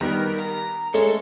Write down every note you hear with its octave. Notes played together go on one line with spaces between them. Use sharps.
D#3 G3 B3 A#4
A#5
G#3 A3 C#4 A4